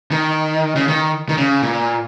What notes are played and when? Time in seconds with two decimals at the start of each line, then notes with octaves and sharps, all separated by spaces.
0.11 D#3
0.76 C#3
0.88 D#3
1.29 D#3
1.38 C#3
1.62 A#2